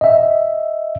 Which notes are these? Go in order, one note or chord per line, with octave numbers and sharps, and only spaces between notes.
D#5 E5